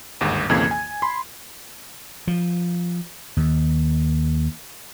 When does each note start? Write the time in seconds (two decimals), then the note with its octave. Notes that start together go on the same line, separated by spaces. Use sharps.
0.21 G1 D#2 G#2
0.49 B1 F2 C#3 E3 A#3 G#6
0.71 G#5
1.02 B5 C6
2.27 F3
3.37 D#2